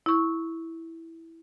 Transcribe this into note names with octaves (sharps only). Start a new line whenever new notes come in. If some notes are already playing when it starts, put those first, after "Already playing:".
E4 C#6